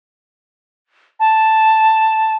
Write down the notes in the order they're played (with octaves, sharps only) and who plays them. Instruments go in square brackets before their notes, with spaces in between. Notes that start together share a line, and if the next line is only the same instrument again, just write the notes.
[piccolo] A5